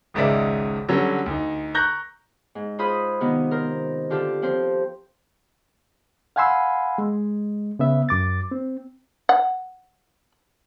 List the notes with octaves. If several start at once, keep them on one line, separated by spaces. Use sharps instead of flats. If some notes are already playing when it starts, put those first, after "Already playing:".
G#1 C#2 G#2 C#3 D5 E5
D3 F#3 G3 C#4
D2 D#4
A#5 C#6 F#6 G6 A#6
G#2
F4 G#4 B4 C5 B5 D#6
C3 D#3 B3 D#4
A#4 C5
D3 F4 G4 A4
F3 C4 C5
F5 F#5 G#5 B5 C6 E6
G#3
C#3 B3 E5
F#2 D6 A6
C4
F#5